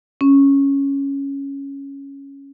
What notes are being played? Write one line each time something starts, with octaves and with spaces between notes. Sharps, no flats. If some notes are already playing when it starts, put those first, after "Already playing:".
C#4